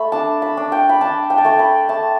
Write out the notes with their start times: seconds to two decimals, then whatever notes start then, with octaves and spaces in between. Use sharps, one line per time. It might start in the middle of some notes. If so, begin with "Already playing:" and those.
Already playing: A3 B5
0.12 D4 A5
0.42 B5
0.57 D4
0.72 G5
0.89 B5
1.01 D4 A5
1.30 G5
1.38 A5
1.45 A3 G5
1.59 B5
1.89 A3 A5